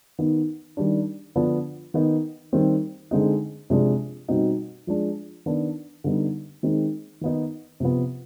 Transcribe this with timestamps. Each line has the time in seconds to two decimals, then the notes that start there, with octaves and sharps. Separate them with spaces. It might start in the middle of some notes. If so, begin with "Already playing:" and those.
0.19 D#3 B3 D#4
0.77 D#3 G3 D4
1.35 D3 F3 B3 D4
1.94 D#3 B3 D#4
2.53 D#3 G3 C4
3.11 D3 G#3 C4 D#4
3.70 C3 F3 G#3 D4
4.28 B2 G3 C4 D#4
4.87 F3 G#3 D4
5.46 D#3 B3 D4
6.04 D3 G3 B3 D#4
6.63 D#3 G#3 C4 D#4
7.21 D#3 B3 D#4
7.80 C3 F3 B3